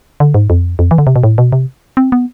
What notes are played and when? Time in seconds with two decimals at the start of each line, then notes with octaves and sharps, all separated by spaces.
0.20 D3
0.34 G#2
0.50 F2
0.79 F2
0.91 E3
0.98 D3
1.07 C3
1.16 B2
1.24 A2
1.38 B2
1.52 C3
1.97 C4
2.12 B3